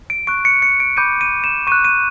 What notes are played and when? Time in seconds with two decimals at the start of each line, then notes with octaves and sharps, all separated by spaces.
0.10 D7
0.27 C#6 F#6 D7
0.45 C#7
0.62 C#7
0.80 D7
0.97 B5 D6 G6 D#7
1.21 D#7
1.44 E7
1.67 C#6 F#6 D#7
1.85 D#7